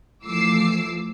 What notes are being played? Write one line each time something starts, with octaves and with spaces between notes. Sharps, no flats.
E3 F3 A3 D6 E6 C7